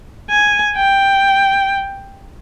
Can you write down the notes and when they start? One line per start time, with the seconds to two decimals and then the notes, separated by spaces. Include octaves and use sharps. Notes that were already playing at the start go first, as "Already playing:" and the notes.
0.30 G#5
0.76 G5